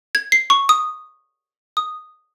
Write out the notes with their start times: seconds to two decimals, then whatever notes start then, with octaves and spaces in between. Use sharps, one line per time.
0.15 G#6
0.32 C7
0.50 C#6
0.69 D#6
1.77 D#6